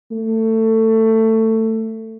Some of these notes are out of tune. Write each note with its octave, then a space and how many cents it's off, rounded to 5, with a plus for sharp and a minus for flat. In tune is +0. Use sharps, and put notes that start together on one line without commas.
A3 +20